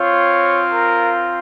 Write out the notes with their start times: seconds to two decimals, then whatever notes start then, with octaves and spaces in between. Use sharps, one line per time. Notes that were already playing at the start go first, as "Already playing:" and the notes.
Already playing: C4 F4 C#5
0.72 A#4